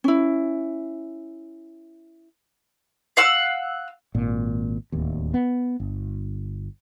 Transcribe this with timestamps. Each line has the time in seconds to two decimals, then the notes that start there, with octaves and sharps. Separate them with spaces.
0.04 C#4 E4
3.17 F5 F#5 E6
4.14 G#1 A#2
4.92 D1 D#2
5.34 B3
5.80 G1